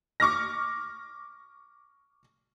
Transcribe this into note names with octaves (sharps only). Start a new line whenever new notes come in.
C#6 D6 F6 A#6